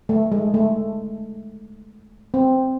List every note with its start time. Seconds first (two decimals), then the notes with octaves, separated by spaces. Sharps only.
0.09 A3
0.32 G#3
0.54 A3
2.34 C4